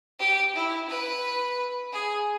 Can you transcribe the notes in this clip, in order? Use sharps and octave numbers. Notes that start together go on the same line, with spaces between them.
G4
E4
B4
G#4